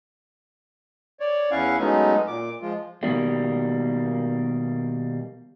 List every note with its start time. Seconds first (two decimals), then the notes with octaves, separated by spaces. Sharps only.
1.20 C#5 D5
1.51 E2 C#4 E4 F5 F#5 C#6
1.79 F#3 G#3 A3 B3 C#4 D#4
2.27 A#2 D6
2.61 F3 G#3 F4
3.03 B2 D#3 G3 A#3